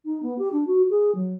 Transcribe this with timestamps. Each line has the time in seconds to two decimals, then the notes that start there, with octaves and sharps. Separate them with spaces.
0.05 D#4
0.22 B3
0.38 G4
0.52 D4
0.67 F#4
0.90 G#4
1.15 F#3